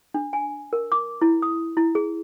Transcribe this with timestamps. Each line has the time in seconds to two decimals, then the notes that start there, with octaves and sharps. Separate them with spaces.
0.14 D4
0.33 G#5
0.73 A#4
0.92 D6
1.22 E4
1.42 D#6
1.77 E4
1.95 G#4